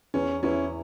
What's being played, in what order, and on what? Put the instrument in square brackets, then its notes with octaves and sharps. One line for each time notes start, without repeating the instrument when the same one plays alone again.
[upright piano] E2 [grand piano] C#4
[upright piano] E2 [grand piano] C#4 E4